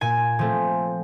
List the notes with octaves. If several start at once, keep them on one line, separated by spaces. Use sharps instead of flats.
A#2 G#5
F3 A3 C4